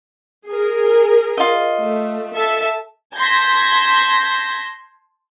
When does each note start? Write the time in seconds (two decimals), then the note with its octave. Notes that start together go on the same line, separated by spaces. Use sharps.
0.48 G#4 A#4
1.37 F4 D#5
1.80 A3
2.34 A4 E5 A5
3.17 A5 C6 G6 G#6 A#6 B6